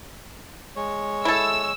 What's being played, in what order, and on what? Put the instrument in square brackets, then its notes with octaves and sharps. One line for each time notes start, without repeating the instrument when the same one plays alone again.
[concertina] G#3 C#5
[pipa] E4 A4 [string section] E6